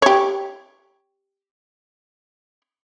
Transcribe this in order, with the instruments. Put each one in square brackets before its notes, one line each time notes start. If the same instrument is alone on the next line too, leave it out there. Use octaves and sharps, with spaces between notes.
[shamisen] G4 C#5